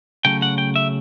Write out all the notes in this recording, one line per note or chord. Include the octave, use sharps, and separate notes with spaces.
C#3 F#3 A3 G5
F#5
G5
E5